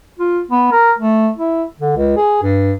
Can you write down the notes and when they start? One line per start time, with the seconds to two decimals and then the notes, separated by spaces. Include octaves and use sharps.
0.19 F4
0.51 B3
0.72 A#4
0.99 A3
1.37 E4
1.80 D3
1.96 C#2
2.17 G#4
2.43 G2